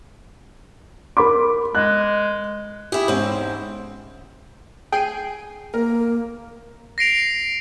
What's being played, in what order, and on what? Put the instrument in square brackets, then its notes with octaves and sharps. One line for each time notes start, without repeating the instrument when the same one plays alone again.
[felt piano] A#4 B5 D6
[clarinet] G#3 [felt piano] F#6
[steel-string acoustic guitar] E4 G#4 [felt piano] G4
[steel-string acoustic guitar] E2 C4 [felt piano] G#2 C#4
[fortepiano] G#4 [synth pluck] G5 C7 D#7
[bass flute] A#3 [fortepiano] A#4
[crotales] A#6 C7 D7 F7